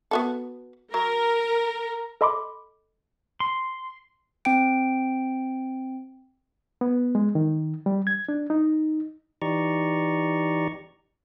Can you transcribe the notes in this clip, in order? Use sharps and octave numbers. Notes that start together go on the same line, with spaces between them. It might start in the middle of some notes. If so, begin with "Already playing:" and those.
B3 F#4 A4
F#3 A#4 A#5
A4 D#5 B5 C6 D6
C6
C4 G5 D7
B3
G#3
D#3
G3
G#6
D4
D#4
E3 D#4 G4 D5 A#5 C#6